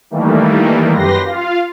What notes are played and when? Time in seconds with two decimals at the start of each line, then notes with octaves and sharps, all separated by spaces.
0.11 D#3 E3 G3 A3 A#3
0.92 F#2 G4 B4 C6 A#6
1.25 F4 F5